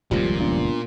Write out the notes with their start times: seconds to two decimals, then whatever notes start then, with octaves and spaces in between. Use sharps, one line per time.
0.11 D#1 C#2 F#2 A#2 F3 G3
0.40 B3 D4 F4